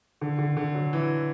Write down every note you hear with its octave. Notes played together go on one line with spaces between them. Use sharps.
D3
D3
D3
F#3
E3